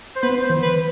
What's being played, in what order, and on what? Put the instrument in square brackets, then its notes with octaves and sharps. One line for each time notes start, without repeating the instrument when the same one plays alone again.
[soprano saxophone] C5
[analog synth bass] B3 [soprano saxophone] B4
[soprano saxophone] C5
[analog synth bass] E3
[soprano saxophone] B4